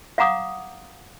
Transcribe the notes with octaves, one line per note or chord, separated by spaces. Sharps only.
F5 F#5 A#5 D6 D#6